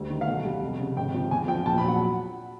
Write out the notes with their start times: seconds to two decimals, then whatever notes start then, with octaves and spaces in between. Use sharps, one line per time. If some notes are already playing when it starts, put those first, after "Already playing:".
Already playing: D2 G3
0.10 D#3
0.21 F5
0.27 B1 F#5
0.45 G3
0.62 F1
0.79 C#3
0.96 G#1 G5
1.14 F3
1.31 E2 G#5
1.48 F3 G5
1.65 A#1 A5
1.78 B5
1.83 F#3
1.88 F#5